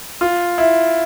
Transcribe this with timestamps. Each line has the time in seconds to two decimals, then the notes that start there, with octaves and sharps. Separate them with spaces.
0.21 F4
0.58 E4